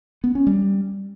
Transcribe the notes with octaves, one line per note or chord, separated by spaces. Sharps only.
B3
C#4
G3